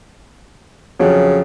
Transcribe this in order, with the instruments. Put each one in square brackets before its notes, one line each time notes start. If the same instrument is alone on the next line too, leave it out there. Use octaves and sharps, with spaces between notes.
[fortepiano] F2 F#3 [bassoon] C#3